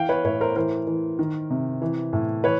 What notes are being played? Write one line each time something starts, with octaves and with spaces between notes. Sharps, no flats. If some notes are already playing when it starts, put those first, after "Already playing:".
Already playing: E3 F5 G5
B4 C#5
A2 B4 C#5
A#4 C5
E3 A#4 C5
E3
D#3
C3
E3
A2
E3 B4 C#5